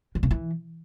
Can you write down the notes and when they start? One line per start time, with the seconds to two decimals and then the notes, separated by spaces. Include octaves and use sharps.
0.15 D3
0.23 C#3
0.31 E3